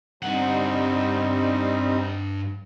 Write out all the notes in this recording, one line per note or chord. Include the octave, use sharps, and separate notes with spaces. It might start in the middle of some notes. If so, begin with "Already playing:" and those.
G2 G3 C4 D#4 F#5